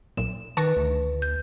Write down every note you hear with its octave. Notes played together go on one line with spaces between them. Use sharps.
B1 A#2 E7
D#3 B4 A5 C#6 A#6
D2
G6